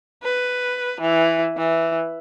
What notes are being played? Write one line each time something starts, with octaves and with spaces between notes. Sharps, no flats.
B4
E3
E3